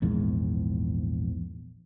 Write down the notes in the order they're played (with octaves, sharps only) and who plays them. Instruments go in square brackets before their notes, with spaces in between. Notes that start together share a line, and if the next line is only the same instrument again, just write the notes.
[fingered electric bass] A#1 E2 G#2